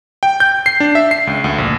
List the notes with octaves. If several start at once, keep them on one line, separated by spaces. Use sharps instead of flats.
G5
G6
C7
D4
E5
C7
C#2
D2
A#1